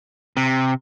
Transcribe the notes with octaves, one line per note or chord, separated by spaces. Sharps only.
C3